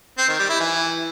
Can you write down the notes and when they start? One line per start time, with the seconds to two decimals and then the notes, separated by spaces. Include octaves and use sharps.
0.18 C4
0.28 D#3
0.39 G3
0.50 E4
0.60 E3